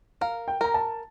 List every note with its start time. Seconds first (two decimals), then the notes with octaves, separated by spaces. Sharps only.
0.21 A#4 F5
0.48 G5
0.61 A#4 A#5
0.74 A5